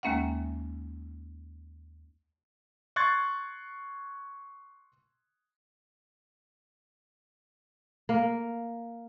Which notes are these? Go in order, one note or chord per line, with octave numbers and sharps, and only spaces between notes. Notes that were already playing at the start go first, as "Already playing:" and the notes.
D#2 G#3 A#3 C#4 E5 F#5
C6 C#6 F#6 G#6 A6
A#3